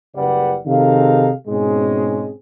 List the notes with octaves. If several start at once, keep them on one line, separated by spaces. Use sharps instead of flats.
F#1 C#3 G3 B4 D5 F#5
C3 D#3 D#4 G#4 A4 F5
G#2 B2 G#3 C4 C#4 G#4